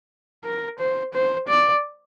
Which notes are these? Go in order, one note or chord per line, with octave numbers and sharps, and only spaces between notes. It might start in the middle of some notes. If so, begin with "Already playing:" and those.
A#4
C5
C5
D5